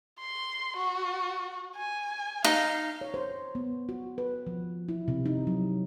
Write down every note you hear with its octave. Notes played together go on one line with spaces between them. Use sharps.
C6
F#4
G#5
D#4 F5
C#5
C5
B3
F#4
B4
F3
E4
C3
D#4
F#3